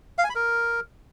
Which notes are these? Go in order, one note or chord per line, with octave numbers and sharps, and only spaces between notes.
F5
G#5
B5
A#4